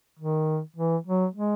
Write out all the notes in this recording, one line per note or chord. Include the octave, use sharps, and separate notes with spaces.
D#3
E3
F#3
G#3